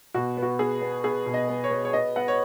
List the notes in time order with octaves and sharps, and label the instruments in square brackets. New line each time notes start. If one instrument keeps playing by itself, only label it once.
[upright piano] B2 F#4
B3
F#4
B3 G#4
B3
B3 G#4
B2
D#5
B3
C#5
B3
C#5
B3 D#5
B3 F#5
C#5